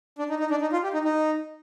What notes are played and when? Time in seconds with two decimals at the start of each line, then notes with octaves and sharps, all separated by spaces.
0.19 D4
0.30 D#4
0.40 D#4
0.50 D4
0.61 D#4
0.73 F4
0.83 G4
0.94 D#4
1.05 D#4